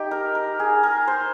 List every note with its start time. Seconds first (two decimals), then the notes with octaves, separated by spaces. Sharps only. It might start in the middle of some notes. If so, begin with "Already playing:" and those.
Already playing: D#4 G4
0.11 A#4
0.35 A#4
0.60 G#4
0.83 A#4
1.08 C5